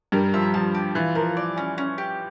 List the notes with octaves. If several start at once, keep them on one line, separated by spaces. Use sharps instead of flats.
G2 G3 A#4
F3 E5
F3 A5
G4
E3 F4
F3 A#4
D5
C#4
C#4
G4